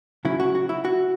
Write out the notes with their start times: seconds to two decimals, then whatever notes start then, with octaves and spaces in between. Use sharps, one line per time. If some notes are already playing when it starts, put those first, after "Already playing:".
0.25 C#3 F#3 C#4 E4
0.40 F#4
0.55 F#4
0.69 E4
0.85 F#4